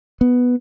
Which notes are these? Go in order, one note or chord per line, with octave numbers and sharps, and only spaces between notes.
B3